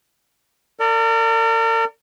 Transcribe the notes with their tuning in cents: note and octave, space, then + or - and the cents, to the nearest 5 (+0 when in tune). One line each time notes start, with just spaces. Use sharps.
A#4 -40 D5 +0